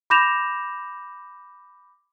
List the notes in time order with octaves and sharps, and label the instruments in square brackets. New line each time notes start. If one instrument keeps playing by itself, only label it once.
[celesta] B5 D6 G6 A#6 E7 F7